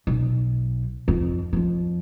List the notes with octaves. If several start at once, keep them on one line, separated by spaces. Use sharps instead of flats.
B1
F2
F2 F3